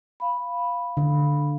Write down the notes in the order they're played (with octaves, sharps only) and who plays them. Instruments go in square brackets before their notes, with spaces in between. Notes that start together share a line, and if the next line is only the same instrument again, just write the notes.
[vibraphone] F5 B5
[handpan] D3